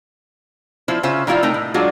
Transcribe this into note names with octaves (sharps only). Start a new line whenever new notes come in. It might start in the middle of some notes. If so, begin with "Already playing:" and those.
F3 E4 F4 C5
C#3 C#4 F4 C5 E5
D#3 G3 E4 F4 F5
C3 A3 D#4 A#4
A2
F#3 G#3 D4 F4 F#4